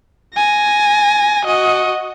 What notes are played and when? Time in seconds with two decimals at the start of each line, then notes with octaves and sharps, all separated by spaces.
0.35 G#5 A#6
1.45 F#4 D#5